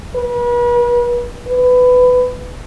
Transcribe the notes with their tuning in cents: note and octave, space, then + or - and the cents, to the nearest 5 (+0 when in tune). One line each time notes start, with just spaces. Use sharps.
B4 -40
B4 +15